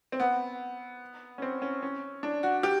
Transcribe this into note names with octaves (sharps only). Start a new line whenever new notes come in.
C4
B3
C#4
C4
C#4
C#4
D4
F#4
G4